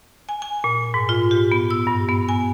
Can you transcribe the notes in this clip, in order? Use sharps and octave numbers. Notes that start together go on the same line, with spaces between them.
G#5
G#5
A#2
G#2
F4
G4
B3
E6
G2
B3
G#5